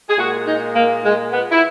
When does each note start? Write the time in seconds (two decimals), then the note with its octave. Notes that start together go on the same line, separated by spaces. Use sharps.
0.09 G#4
0.18 A#2 G#3 F#4
0.46 D#4
0.75 A#3
1.05 G#3
1.33 B3
1.52 E4